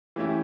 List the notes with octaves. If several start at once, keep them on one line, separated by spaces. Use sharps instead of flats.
E3 A3 C#4 E4 G4